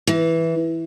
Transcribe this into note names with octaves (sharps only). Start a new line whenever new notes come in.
E3